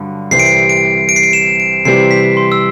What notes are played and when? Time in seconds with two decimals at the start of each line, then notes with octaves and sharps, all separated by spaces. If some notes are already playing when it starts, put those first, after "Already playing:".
Already playing: G2 D3 F#3
0.31 C2 C3 E3 G3 C4 C7
0.39 D7
0.46 C7
0.69 D7
1.09 D7
1.16 C7
1.23 D7
1.33 E7
1.60 D7
1.85 C3 E3 G3 C4 G4 C7
2.11 B6
2.37 C6
2.52 E6